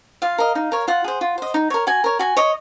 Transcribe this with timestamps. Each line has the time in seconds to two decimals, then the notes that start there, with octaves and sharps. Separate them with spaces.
0.22 F4 F5
0.38 A#4 D#5
0.55 D#4
0.72 A#4 C#5
0.88 F4 F#5
1.04 G#4 C5
1.21 F4
1.38 C5 D#5
1.54 D#4
1.70 A#4 C#5
1.87 F#4 G#5
2.04 A#4 C#5
2.19 F#4 G#5
2.37 C#5 D#5